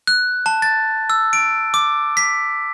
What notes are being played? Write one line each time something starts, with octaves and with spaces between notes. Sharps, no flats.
F#6
A5
A6
E6
D7
D6
B6